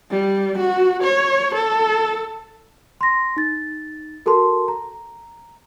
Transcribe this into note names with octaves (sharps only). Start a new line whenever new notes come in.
G3
F#4
C#5
A4
C6 A#6
D#4 A6
F#4 A4 A#4 A5 C6
A#5